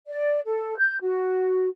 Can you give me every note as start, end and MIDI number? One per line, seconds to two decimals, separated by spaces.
0.07 0.40 74
0.46 0.77 69
0.79 0.97 91
1.01 1.68 66